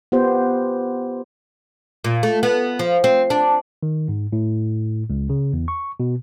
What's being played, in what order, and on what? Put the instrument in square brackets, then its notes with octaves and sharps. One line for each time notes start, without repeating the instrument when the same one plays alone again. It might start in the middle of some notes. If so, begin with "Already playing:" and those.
[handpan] B3 F4 G4 C5
[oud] A#2
A3
B3
F3
C4
D4
[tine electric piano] D#3
G#2
A2
C#2
C#3
E2
C#6
B2